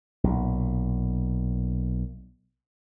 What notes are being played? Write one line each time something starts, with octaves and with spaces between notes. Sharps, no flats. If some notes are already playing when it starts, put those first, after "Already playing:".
B1 A#2